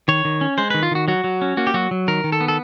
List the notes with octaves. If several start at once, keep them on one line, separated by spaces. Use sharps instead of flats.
D#3 C#5
D#3
C#4
G#3 C5
D#3 B4
F4
D#3 F#4
F#3 F#4
F#3
C#4
A#3 F#4
G4
F#3 F#4
F#3
D#3 A#4
D#3
A4
B3
A4